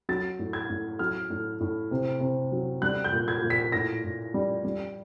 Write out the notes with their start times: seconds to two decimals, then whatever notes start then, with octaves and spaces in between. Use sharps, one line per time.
0.09 F#3 A6
0.39 A2
0.53 G#6
0.70 A2
0.99 F#3 F6
1.30 A2
1.60 A2
1.91 C3
2.20 C3
2.52 F#3
2.82 G3 F#6
3.04 G6
3.12 A#2
3.28 G#6
3.42 A#2
3.50 B6
3.72 A2 A#6
4.04 A2
4.34 G3
4.64 G3